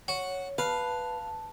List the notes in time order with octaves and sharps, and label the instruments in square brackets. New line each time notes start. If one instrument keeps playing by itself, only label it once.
[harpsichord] F#4 [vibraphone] C#5
[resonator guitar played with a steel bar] B4 [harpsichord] F5 [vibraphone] A5